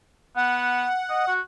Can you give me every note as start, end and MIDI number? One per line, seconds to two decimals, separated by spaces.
0.37 0.86 59
0.37 1.33 78
1.10 1.25 75
1.28 1.40 66